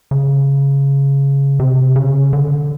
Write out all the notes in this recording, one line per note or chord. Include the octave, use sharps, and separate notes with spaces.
C#3
C3
C#3
D3